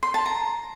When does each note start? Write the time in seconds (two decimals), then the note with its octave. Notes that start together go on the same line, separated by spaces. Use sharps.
0.03 C6
0.14 A5
0.26 A#5